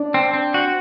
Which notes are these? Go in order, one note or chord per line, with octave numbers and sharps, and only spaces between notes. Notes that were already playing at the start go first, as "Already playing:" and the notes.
Already playing: D4
C4
C4
F#4